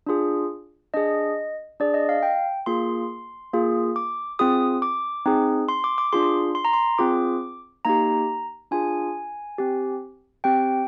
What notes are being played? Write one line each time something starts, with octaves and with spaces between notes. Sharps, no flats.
D4 F4 G#4
D4 G#4 D#5
D4 G#4 D5
D#5
F5
G5
A#3 F4 G#4 C6
A#3 F4 G#4
D6
C4 F4 G#4 D#6
D6
C4 D#4 G#4
C6
D6
D6
D4 F4 G#4 C6
C6
A#5
C6
C4 F4 G#4 D6
A#3 D#4 G4 A#5
D4 F4 G#4 G#5
C4 G4
C4 G4 G5